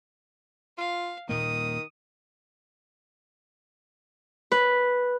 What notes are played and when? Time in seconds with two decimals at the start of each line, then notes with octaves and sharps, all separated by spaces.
0.78 F4 F5
1.29 D#1 A#2 D#3 A#3 D#6
4.52 B4